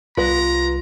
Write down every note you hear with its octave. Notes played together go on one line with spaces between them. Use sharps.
C2 G3 B3 F4 B4 A#5